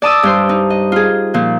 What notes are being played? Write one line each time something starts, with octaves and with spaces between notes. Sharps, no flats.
D5 A5 D#6 E6
G2 C5 C6
D#4
D#5
F4 G#4
A#2 F3